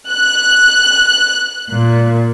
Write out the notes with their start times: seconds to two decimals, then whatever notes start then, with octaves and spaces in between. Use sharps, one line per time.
0.11 F#6
1.72 A#2